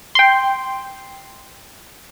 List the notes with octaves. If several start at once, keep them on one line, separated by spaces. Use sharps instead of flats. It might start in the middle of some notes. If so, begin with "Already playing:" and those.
G5 C6